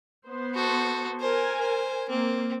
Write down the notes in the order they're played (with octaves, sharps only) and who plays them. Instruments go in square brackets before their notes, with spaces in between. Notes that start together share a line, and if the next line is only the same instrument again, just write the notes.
[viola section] B3 C5
[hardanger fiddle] F#4 A4
[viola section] A#4 G#5 [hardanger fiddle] C5
[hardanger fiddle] C5
[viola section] A#3 [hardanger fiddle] C4